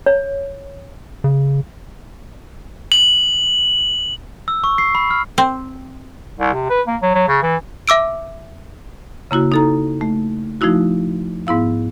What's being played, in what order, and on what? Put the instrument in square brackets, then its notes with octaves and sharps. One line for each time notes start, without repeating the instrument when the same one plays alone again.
[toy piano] C#5
[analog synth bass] C#3
[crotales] F#7
[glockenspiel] E6
C#6
C7
B5
F6
[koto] C4
[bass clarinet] C2
C3
B4
A#3
F#3
F#3
C#3
E3
[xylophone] E5 D6 E6 D7
[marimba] C#3 A#3 E4 F#4
D#4 A4 A#5
A3
F3 A3 D#4 E4 F#4
G#2 B3 E4 F5